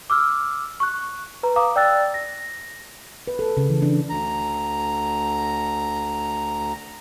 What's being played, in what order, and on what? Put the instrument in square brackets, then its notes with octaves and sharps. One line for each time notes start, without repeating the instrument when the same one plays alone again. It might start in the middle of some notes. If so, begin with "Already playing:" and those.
[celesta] D6 E6 F6
C#6 F#6
B4 A#5
F5 A#5 D6 D#6
D5 G5 E6 F#6 A6
A#6
[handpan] B4
A4
C#3
E3
D4
[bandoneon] D2 A#5